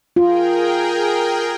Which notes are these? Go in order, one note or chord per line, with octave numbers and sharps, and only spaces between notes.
F4 G#4 A#4 G5